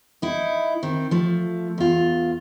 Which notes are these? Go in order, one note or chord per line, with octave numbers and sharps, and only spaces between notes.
D#4 E4
D#3 C4
F3 A3
E2 F4